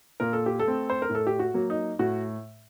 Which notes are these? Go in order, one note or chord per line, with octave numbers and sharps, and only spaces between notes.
A#2 A#4
A4
G4
A4
A3 C4
C5
A#4
A2
A4
G4
F#4
F#3 A#3
D#4
A2 F#4